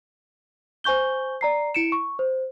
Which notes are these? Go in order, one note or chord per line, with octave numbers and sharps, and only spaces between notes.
C5 G#5 C#6 G6 G7
D5 A#5 C7
E4 C#7 D7 E7
C#6
C5